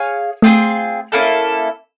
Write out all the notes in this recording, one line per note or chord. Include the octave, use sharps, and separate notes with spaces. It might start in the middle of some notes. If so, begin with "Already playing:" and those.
Already playing: G#4 C#5 F5 G#5
A3 C4 F4 G#4
A#3 C#4 E4 A4